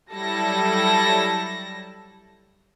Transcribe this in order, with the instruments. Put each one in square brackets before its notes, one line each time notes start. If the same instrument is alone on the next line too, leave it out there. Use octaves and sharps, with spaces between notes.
[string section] F#3 G3 E4 A4 A5 A#6